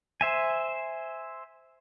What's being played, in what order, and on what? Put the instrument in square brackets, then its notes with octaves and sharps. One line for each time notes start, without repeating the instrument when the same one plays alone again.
[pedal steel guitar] C5 E5 G#5